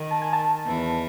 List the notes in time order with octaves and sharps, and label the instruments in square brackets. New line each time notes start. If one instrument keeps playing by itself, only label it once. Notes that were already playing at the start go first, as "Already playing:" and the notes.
Already playing: [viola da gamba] D#3
[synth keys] A5
G#5
A5
[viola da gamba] E2 E3